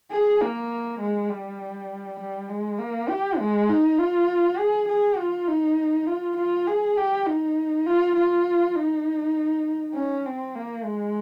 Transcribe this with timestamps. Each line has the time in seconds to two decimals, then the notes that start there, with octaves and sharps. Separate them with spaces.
0.11 G#4
0.41 A#3
1.00 G#3
1.30 G3
2.20 G3
2.50 G#3
2.79 A#3
3.09 G4
3.39 G#3
3.69 D#4
3.99 F4
4.58 G#4
4.88 G#4
5.18 F4
5.48 D#4
6.07 F4
6.37 F4
6.67 G#4
6.97 G4
7.27 D#4
7.86 F4
8.16 F4
8.76 D#4
9.95 C#4
10.26 C4
10.55 A#3
10.85 G#3